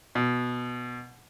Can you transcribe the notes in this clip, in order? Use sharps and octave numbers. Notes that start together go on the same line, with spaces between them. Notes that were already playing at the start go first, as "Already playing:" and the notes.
B2